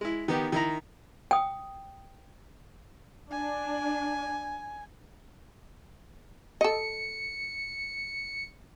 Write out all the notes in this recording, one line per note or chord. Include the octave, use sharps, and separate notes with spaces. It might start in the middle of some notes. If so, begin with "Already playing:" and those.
G#3 E4
D#3 B3 G4
D#3 E4 A#5
G5 D#6
D4 G#5
A4 D#5 C#7